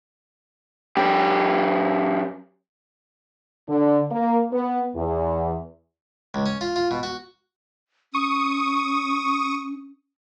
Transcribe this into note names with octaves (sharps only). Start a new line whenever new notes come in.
F#2 G4
D3
A#3
B3
E2
C#2
C#4
F4
F4
B2
F#4
C#4 C#6 D#6